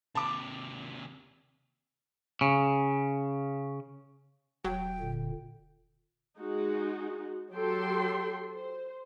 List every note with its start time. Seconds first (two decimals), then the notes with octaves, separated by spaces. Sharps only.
0.15 D#2 C3 A5 D6
2.41 C#3
4.65 E1 F#3 G5
5.00 A#2 D3
6.38 G#3 D#4 F#4
7.52 F#3 G4 A4 G5 C6
8.51 C5